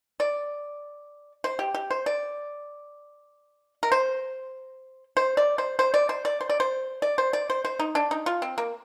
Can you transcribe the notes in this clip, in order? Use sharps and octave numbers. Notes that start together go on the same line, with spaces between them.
D5
C5
G4
G4
C5
D5
A#4
C5
C5
D5
C5
C5
D5
C5
D5
C5
D5
C5
D5
C5
D5
C5
C5
D#4
D4
D#4
F4
C4
A#3